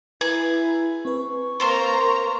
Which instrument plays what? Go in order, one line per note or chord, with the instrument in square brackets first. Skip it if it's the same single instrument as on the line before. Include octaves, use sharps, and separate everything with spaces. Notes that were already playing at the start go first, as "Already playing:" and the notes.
[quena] E4 [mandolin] G#4 [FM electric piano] B4 A#5
[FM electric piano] C4 B4 [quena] C#6
[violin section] A#3 A#5 [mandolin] F4 C5 C6